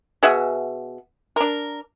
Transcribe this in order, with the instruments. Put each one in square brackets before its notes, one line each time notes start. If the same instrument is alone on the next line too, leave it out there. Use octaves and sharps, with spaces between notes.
[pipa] B2 G#4 E5 F#5
D4 A#4